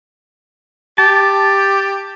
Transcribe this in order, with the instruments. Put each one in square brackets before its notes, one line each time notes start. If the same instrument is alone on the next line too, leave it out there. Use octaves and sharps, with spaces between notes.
[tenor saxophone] G4 [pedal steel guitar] A5